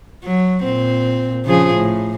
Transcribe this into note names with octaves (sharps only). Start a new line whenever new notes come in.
F#3
A#2 C4
C#3 F3 G#4
A2